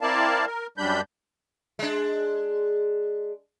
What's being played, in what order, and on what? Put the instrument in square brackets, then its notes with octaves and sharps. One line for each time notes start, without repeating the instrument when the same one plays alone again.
[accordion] C4 E4 A#4 D5 F5 A5
A#4
F#2 G3 D4 B5 G6
[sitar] G#3 D4